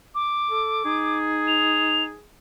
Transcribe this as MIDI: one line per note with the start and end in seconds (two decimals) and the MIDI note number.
0.15 1.19 86
0.51 0.81 69
0.85 2.14 63
0.85 2.25 68
1.48 2.04 101